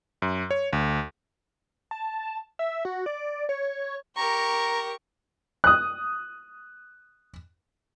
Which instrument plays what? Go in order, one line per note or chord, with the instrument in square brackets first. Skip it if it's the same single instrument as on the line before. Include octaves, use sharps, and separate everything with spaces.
[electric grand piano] F#2
C#5
D2
[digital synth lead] A5
E5
F#4
D5
C#5
[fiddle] G4 A#4 [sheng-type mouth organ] A#5 [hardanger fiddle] C#6
[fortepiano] D#6 F#6